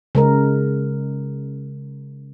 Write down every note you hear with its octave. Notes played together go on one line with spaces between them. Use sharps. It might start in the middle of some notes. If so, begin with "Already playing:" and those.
C#3 G#3 A#4